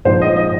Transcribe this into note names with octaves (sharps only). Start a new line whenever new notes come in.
A#1 G#2 F3 C5
D#5
D#5